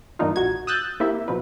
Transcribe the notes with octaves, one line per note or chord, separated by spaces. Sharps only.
G2 E3 A#3 D4 D#4 F4
A#1 F#4 G#6
D#6 E6 F#6 G6 A6
A#3 C4 E4 G4 E5
B2 F3 C4 B4